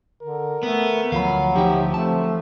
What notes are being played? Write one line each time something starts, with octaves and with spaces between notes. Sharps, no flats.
D3 A#4
A3 B3
D2 F3 F#3 F5 B5
D2 F3 D#4 G4 E5
A3 C4 A5